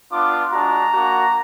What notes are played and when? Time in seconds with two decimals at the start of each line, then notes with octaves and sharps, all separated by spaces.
0.10 B3 D4 F4 D6
0.52 G#3 D4 F#4 A#5
0.93 A#3 D4 F#4